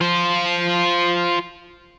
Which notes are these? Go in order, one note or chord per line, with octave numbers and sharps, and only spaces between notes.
F4 C5